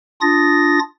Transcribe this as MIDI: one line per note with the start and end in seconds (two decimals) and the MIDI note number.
0.21 0.79 62
0.21 0.79 65
0.21 0.79 87
0.21 0.79 93
0.21 0.79 94